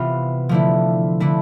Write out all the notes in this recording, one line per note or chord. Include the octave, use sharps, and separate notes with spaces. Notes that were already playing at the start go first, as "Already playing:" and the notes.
Already playing: C3 E3 B3 F4
D3 F3 A3 E4
D3 A3 E4